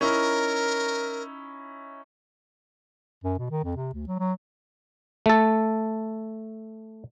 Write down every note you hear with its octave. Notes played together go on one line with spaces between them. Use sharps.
C#4 D#4 E4 A#4
F#2
B2
D#3
F2
C3
D2
F#3
F#3
A3 A4